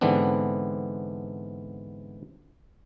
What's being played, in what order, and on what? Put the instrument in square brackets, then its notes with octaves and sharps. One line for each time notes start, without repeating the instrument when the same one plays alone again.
[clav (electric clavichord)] G#2 D3 E3 B3 C4 D4